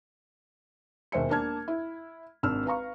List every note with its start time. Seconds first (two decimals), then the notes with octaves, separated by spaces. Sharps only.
1.12 E1 D#2 C5 E5 C#7
1.30 A#3 D4 A5 F6 G#6
1.68 E4
2.43 G#1 D4 E6 F6
2.66 B4 F5 A#5 C#6